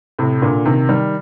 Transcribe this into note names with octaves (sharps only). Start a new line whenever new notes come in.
A2 C3
A#2 D3
C3 D#3
D#3 G3